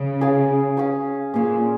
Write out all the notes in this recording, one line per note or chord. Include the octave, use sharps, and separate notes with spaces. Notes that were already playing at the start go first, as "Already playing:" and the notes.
Already playing: C#3
C#4 G#4 C#5 F5
C#4 G#4 C#5 F5
A#2 C#4 G#4 C#5 F5